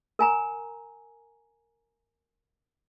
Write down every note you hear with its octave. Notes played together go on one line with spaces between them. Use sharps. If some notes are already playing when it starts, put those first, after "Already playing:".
A#4 G#5 A#5